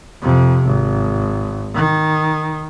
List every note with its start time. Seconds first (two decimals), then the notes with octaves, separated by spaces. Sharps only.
0.22 F2 C3
0.66 G#1
1.75 D#3